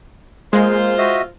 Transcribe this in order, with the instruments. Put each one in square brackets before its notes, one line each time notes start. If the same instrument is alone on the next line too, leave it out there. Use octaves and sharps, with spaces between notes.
[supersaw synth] G#3 [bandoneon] A#3 [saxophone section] F4 C5
[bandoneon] F#4 D#5 E5